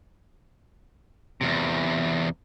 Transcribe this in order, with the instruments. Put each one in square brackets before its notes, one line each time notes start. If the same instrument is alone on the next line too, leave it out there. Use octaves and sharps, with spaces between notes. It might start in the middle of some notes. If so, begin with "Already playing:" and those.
[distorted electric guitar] E2 C3